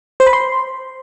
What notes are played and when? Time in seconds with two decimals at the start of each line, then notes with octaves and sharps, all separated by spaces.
0.20 C5
0.27 B5
0.33 C6